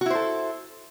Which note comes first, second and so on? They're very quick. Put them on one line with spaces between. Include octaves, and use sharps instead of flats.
F#4 E4 C5 A4